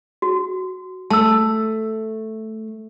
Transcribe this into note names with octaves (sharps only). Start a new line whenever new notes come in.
F#4
A3 A5 E6